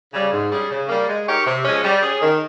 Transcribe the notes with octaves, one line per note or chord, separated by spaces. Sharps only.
C#3 G3
G#2
G3 C#4 G#4
C#3
G3 A#3
G#3
D#4 G4 A#4 C#5
C3
F3 G#3 C#4
G3
C#4 G#4
D#3